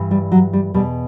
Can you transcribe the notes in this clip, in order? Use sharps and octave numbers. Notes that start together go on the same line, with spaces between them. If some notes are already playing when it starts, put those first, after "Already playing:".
Already playing: G2 E3
G3
F#3
G3
E2 B2 G3